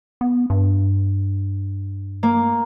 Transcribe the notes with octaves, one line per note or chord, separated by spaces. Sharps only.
B3
G2
A#3